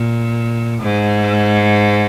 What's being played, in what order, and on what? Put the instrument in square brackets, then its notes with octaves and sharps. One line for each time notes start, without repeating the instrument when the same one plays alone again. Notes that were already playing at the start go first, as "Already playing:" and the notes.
Already playing: [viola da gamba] A#2
G#2